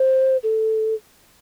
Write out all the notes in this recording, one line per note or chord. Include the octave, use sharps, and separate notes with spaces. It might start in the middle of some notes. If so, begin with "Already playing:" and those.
Already playing: C5
A4